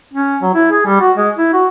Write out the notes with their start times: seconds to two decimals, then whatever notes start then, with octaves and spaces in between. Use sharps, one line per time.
0.13 C#4
0.42 F#3
0.55 E4
0.71 G#4
0.86 G3
1.01 F#4
1.17 G#3
1.36 E4
1.53 F#4